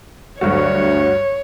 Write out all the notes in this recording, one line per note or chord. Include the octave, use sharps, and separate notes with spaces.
D2 G2 F#3 F#4 C#5